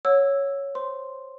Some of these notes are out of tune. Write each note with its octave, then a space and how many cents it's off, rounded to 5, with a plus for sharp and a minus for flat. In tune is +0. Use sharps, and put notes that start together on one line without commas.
C#5 +0 F#5 -30 E6 +0
C5 +0 C6 +0